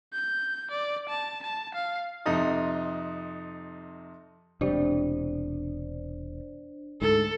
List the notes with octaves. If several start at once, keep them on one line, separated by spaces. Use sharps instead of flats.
G6
D5
A5
A5
F5
F2 C3 D#4 D#5 D#6
E1 C3 G3 D4 C5 D5
D2 G#2 A4